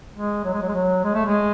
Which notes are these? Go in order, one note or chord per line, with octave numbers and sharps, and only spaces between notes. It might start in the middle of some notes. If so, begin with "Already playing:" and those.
G#3
F#3
G#3
F#3
G#3
F#3
G#3
A3
G#3